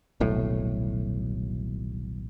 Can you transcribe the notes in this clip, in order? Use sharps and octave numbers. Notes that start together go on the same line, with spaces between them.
D#1 B1 A2